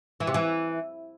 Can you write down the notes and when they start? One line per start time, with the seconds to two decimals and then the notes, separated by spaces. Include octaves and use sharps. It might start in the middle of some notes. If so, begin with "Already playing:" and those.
0.20 E3
0.27 C3
0.34 E3